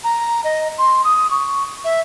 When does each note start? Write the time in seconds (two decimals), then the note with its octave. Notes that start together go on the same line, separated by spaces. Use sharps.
0.04 A#5
0.44 D#5
0.78 C6
1.04 D#6
1.31 C#6
1.84 E5